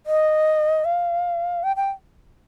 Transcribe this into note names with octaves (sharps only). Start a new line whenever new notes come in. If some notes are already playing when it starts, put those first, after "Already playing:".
D#5
F5
G5
G5